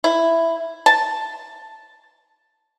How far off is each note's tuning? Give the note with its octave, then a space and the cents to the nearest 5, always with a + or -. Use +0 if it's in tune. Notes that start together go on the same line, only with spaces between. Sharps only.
E4 +5
A5 -5